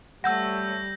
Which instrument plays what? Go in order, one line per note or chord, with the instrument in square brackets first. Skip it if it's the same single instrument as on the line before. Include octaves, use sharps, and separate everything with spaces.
[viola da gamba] G3 [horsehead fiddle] A3 C#5 [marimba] F#5 [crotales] E6 G6 A#6